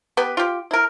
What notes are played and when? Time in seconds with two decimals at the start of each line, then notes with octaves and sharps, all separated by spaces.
0.17 B3 G4 B4
0.37 F4 G4
0.71 E4 A#4